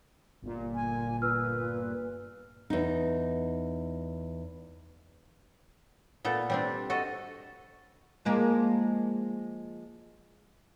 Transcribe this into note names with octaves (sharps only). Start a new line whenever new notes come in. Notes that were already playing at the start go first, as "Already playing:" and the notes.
G1 A#2
G#5
B4 E6 F6
E2 D#4
A#2 B3 A4
G3 C4 D4
F#4 A4 D#5
F3 G#3 A#3